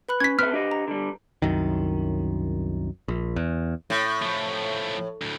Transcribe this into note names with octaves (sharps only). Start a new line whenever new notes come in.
B4 B5 F#6
C#4 G#6 B6
C4 B4 E5 F6 F#6 B6
D4 G4 D#5
A#5
D3 G3
C2 F#2 D#3
A#1
E2
A2
F3 A3
D2 A2